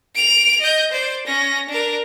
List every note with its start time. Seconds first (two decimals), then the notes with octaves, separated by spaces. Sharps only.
0.15 D7 F7
0.61 D#5 G6
0.92 C5 D5
1.27 C#4 A#6
1.69 D4 A#4